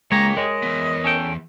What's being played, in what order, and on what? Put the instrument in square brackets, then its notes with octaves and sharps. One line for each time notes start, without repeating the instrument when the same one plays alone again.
[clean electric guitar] C#2 A#3 C#5 [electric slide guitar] G#3 [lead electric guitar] G#4 G5 [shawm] A#5
[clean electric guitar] G#3 [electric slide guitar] A#4 C#5 [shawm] D#5
[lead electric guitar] E3 B3
[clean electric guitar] C#4 A4 G5